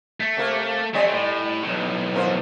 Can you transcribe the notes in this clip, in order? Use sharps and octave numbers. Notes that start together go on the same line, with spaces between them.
A3
C3 A#3 A#4
G3 A3 C4 C#5 D#5
A2
B1 A2
F2 A#4 C5